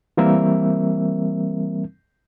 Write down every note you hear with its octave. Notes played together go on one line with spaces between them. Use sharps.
E3 G3 A#3 C4 A#4 E5